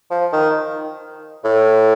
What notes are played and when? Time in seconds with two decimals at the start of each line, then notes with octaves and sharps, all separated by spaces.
0.11 F3
0.33 D#3
1.44 A2